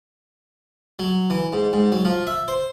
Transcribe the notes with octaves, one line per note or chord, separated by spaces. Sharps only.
F#3
E3
G#2
G#2
F#3
F3
E5
C5